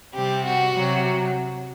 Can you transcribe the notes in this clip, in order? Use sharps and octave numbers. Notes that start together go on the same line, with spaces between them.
C3 G3 C4 G4
F#4
C3 F#3